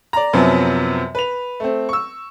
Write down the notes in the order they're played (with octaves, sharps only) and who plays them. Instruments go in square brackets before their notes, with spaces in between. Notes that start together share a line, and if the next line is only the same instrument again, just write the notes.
[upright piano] D5 A#5
F#2 C3 F3 F#3 B3
B4 F7
A3 C4
C#6 E6